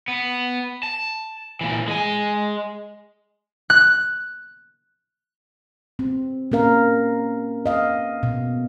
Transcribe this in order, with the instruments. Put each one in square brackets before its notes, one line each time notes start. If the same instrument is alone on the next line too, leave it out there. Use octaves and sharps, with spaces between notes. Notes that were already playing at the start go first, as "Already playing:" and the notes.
[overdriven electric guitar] B3
A5
A#2 E3
G#3 G#5
[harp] F#6
[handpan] C4
A#3 C#4 A#4 F5
D#5 F5
B2